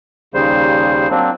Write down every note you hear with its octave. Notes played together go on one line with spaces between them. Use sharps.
D#2 C#3 G3 C5
F#3 A#3 C4 D4